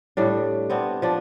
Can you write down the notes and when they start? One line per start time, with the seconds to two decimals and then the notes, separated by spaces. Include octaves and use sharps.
0.17 A2 G3 D4
0.70 B3 C4 D4
1.02 F3 D4